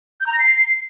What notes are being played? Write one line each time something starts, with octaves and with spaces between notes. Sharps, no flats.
G6
A#5
A#6
C7